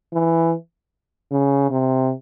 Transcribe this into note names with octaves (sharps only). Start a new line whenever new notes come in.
E3
C#3
C3